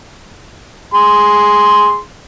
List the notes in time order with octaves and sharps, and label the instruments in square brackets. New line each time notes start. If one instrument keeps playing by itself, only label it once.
[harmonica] G#4 C6